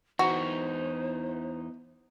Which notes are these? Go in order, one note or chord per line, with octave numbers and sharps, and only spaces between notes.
E2 E3 D#4 F#4 C5